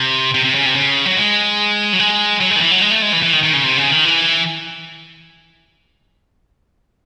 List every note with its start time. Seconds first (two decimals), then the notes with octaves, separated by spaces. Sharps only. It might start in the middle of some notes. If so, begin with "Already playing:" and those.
Already playing: C3
0.34 C3
0.45 C3
0.55 C#3
0.66 C3
0.75 C#3
1.06 F#3
1.16 G#3
1.93 F#3
1.99 G#3
2.41 F#3
2.51 G#3
2.56 D#3
2.61 E3
2.71 F#3
2.81 G#3
2.91 A3
3.02 G#3
3.13 E3
3.23 E3
3.33 D#3
3.43 D#3
3.53 C#3
3.64 C3
3.77 C#3
3.91 D#3
4.05 E3